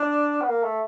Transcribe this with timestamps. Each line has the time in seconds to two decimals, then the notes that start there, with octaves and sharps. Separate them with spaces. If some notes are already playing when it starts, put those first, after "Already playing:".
Already playing: D4
0.41 B3
0.48 A#3
0.63 A3